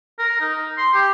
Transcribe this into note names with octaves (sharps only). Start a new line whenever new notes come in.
A#4
D#4
C6
G4